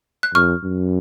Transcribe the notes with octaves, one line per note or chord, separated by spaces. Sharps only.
F#6
F2 C#6 F6
F#2